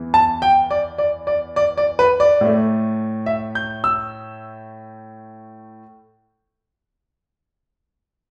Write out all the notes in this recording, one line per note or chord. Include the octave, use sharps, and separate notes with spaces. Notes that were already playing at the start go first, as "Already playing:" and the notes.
Already playing: E2 E3 B3
A5
G5
D5
D5
D5
D5
D5
B4
D5
A2 A3
E5
G6
E6